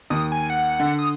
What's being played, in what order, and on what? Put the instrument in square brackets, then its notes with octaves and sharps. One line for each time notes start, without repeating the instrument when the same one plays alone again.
[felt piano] D#2 [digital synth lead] D#6
[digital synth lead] G#5
F#5
[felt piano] D3
[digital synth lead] D#6